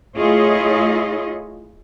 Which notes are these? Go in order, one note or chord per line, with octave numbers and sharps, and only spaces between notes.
A3 E4 F4 G#4 C#5 D#5